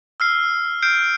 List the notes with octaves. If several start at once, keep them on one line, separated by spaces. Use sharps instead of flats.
E6 F6 C7
F6 G6 C7 D7